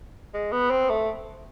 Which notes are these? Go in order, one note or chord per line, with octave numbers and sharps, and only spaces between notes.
G#3
B3
C4
A3